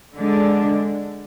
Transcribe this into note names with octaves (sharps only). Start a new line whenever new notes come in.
D3 G#3 D4